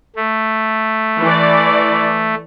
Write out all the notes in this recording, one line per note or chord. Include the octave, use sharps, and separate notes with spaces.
A3
E3 D5